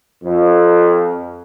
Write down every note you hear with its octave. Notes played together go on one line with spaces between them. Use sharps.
F2